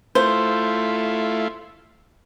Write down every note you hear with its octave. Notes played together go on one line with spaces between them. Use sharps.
A3 E4 F4 C5